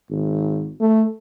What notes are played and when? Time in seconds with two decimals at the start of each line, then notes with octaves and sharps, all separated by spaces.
0.10 G#1
0.80 A3